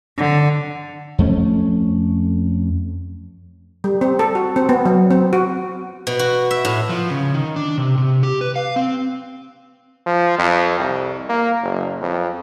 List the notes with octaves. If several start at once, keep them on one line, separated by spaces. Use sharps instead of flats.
D3
F2 A3 C#4
G3
C4
A4
F#4
C4
B3
F#3
C4
F#4
B2
F#4
E5
A2
F3
C#3
D#3
D4
C3
C3
G4
B4
F5
C4
F3
F2
C2
A#3
F#1
F2